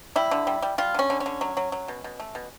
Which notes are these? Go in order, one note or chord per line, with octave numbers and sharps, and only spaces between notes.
G3 E4
D3
G3
G3
G3 F4
D3 C#4
D3
C#4
D3
F#3
F#3
F#3
B2
B2
A3
B2